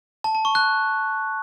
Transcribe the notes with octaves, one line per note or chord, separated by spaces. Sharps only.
A5
A5
C#6
F#6